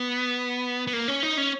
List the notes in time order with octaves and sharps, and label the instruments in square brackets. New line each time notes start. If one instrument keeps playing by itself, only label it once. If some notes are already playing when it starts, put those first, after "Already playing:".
Already playing: [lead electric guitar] B3
B3
A#3
C#4
D#4
C#4